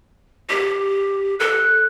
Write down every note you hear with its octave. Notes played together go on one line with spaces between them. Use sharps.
G4
A4 F#6